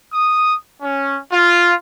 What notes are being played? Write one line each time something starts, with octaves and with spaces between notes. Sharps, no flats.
D#6
C#4
F4